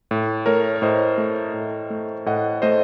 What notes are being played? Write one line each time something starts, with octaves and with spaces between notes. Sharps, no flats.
A2
A3 A#4 C#5
C#5
A2 C5 D#5
A3
A2
A3
A2 D#5 F#5
A3 C5 D#5